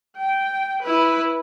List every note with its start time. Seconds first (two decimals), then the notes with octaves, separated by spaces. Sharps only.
0.18 G5
0.83 E4 B4